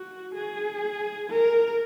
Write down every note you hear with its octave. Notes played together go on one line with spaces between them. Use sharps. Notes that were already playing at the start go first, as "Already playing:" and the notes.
Already playing: F#4
G#4
A#4